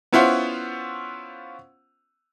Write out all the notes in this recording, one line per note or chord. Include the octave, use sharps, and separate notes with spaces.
B3 C#4 E4 F4 C5 F#5